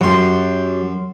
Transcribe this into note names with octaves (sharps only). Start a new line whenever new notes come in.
F#2 F#3 G4 C6